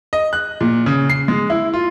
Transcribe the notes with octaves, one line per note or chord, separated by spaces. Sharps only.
D#5
F#6
A#2
C#3
C7
G#3
E4
F4